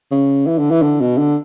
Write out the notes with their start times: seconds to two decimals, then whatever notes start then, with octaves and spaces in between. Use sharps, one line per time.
0.11 C#3
0.47 E3
0.58 D3
0.71 E3
0.82 D3
1.01 B2
1.18 D3